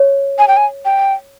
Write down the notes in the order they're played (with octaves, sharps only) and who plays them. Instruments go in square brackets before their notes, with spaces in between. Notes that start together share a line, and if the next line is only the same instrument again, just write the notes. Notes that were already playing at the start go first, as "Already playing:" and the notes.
Already playing: [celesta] C#5
[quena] G#5
G5
G#5
G5